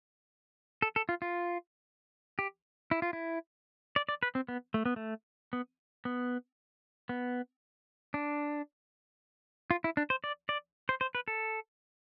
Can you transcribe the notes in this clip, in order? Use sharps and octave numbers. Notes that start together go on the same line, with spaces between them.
A4
A4
F4
F4
G4
E4
F4
E4
D5
D5
B4
C4
B3
A3
B3
A3
B3
B3
B3
D4
F4
E4
D4
C5
D5
D5
C5
C5
B4
A4